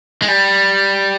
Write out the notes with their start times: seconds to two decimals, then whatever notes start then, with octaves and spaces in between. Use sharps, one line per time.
0.22 G#3
0.28 G3